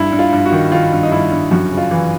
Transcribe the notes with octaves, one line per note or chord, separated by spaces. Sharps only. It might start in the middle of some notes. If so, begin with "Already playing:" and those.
Already playing: G2 E4
G2
F4
G2
F#4
D#3
D#3 F4
G2
D#4
G2 E4
G2
F#2 F#4
C#3
F4
E3